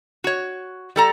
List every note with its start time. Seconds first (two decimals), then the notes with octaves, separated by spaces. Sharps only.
0.24 F#4 C#5
0.96 G3 A4 A#5